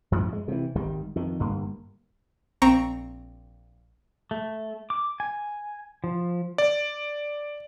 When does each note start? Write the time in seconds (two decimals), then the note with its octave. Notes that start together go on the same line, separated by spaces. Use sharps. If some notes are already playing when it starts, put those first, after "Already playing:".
0.12 F#2 A2 F3 F#3
0.33 G#3
0.48 C3 E3
0.75 G#1 D#3 G3
1.16 F2 D#3
1.40 G1 G2 A#3
2.62 A#1 C4 A#5 C#6
4.31 A3
4.90 D6
5.20 G#5
6.04 F3
6.58 D5